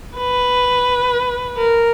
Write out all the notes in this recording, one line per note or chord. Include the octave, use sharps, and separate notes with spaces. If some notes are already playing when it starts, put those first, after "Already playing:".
B4
A#4